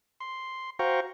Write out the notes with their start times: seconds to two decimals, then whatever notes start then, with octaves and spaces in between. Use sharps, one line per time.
0.20 C6
0.79 F#4 C5 F5 G5 A#5 C#6